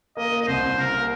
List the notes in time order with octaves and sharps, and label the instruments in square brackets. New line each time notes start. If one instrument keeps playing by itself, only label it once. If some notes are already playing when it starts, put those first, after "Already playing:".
[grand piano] A#3 [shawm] D#5
[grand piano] A#3
[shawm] D#5
[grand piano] C2 [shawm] C5
[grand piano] C2
[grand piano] C3 [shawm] A#4
[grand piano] A#3